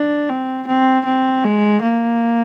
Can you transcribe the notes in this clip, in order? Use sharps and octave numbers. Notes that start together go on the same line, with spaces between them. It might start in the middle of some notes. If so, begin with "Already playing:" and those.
Already playing: D4
C4
C4
C4
G#3
A#3